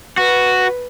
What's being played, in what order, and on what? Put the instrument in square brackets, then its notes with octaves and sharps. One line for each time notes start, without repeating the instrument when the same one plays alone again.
[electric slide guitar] F#4 [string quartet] B4